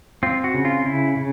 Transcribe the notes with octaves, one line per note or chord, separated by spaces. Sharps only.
C4 F4
F#4
C#3
F4
C#3 E4
C#3